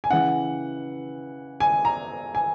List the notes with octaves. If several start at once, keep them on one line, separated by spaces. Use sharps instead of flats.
G#5
C#3 E3 F#5
G#5
A#5
G#5